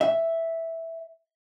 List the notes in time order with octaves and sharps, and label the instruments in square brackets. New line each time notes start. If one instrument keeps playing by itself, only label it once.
[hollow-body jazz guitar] E5